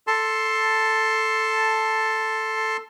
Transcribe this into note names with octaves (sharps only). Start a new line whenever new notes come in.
A4 A5 C6